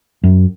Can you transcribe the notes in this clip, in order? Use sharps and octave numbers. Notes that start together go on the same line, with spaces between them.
F#2